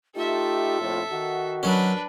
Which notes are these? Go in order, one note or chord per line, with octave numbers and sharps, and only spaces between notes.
A3 D#4 F4 G4 A4 E5
A#1 F2 A2
D#3 F#4 F#5
F#3 C#4 D4 A#4 B4